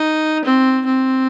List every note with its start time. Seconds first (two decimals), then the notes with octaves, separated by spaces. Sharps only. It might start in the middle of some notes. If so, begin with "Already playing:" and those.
Already playing: D#4
0.45 C4
0.85 C4